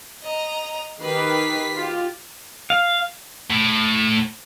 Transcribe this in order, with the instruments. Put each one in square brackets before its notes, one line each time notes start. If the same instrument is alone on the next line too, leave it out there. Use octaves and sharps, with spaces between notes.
[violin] D#5 A#5
[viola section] D#3 G4 B4 [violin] B6 C7
[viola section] F4 G4
[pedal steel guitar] F5
[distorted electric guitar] A2